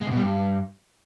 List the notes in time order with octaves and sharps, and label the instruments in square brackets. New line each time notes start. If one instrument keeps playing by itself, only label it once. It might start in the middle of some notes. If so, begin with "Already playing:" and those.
[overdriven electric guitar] G#3
C3
B2
G3
G2